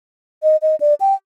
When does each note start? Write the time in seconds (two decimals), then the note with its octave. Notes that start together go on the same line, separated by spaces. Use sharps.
0.43 D#5
0.62 D#5
0.80 D5
1.01 G5